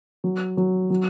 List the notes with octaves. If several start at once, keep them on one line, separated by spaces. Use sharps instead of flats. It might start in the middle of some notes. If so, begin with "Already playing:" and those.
F#3
F#3
F#3